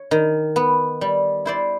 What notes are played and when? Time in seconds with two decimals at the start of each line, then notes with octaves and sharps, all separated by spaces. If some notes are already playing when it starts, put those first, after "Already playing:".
Already playing: C#5
0.11 D#3
0.56 B3
1.01 G3
1.45 E4 C5 D5